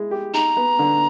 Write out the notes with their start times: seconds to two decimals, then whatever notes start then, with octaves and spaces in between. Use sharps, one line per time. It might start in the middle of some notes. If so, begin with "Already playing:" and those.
Already playing: G#3 E4
0.11 G4
0.34 D#4 A#5
0.57 B3
0.79 D3